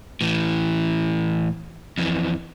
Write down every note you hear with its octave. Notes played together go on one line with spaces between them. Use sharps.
A2 E3
F2 E3